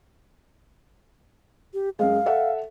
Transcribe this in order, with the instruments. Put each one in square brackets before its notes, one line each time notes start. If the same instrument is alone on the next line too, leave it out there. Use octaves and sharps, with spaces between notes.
[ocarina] G4
[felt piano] F#2 G#3 [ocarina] F5
[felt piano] A4 E5 F#5